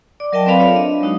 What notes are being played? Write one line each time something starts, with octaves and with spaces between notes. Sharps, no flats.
D5 D6
F#3 A#4 D#5 E5 G5 A5
C4 A4 B4 D5 F5 B5
F4 C#5 E5 F5
D4 D#5
F#3 G#3 D#4 F#4